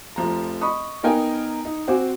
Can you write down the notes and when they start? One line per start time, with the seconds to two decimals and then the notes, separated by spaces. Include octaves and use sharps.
0.16 F1 F3 A#5
0.61 D#5 B5 C#6 D#6
1.03 B3 D#4 A#4 G5 G#5
1.65 D#4
1.87 C4 F#4 C5 G#5 D6